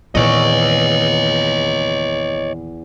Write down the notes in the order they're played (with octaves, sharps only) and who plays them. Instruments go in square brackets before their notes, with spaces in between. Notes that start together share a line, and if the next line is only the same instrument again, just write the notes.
[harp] E2 C#6 [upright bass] A#2 D#3 [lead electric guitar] C#5 D#5